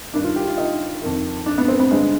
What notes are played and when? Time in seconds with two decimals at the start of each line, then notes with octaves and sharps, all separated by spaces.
0.13 G2 D#3 D4
0.24 F4
0.36 G4
0.47 F4
0.58 D#4
1.02 F2 D#3
1.46 D4
1.58 B3
1.68 C4
1.80 B3
1.91 G2 D3 G#3